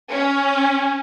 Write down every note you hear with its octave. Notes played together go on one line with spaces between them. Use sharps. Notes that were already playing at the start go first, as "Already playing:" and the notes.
C#4